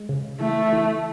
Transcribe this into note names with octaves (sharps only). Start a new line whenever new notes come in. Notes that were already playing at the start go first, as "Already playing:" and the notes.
Already playing: G#3
C#3
E3 A3
E3